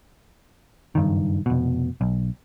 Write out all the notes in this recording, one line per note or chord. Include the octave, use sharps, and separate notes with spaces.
F#1 G2 D#3
F1 B2
B1